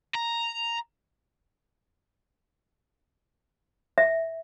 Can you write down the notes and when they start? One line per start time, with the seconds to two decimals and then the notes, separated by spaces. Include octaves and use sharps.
0.15 A#5
3.98 E5